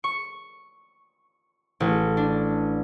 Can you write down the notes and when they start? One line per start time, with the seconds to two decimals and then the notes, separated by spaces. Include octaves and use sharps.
0.04 C#6
1.80 A1
2.17 D4